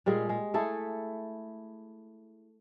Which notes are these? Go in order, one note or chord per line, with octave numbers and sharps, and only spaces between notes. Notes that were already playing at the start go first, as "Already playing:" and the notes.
A#2 G3 G#3 G#4
G#3
A3 E4 G#4 A4